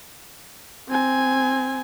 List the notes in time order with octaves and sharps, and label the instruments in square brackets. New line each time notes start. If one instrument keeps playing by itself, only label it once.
[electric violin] C4 G#5